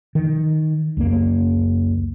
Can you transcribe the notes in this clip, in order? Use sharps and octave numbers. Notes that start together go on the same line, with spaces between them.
D#3
C#2 F#2 A#3